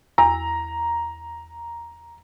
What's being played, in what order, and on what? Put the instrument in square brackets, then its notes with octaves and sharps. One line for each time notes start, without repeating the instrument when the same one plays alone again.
[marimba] E2 E6 [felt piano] A#5